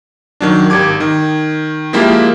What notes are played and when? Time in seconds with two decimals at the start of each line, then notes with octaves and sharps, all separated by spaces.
0.41 D#3 F#3 D4
0.70 G#1 G4 D6 G#6
1.00 D#3
1.93 F3 G#3 A#3 E4 F4 G4